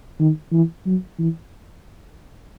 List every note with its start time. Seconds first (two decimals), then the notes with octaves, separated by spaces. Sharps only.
0.20 D#3
0.52 E3
0.86 F#3
1.19 E3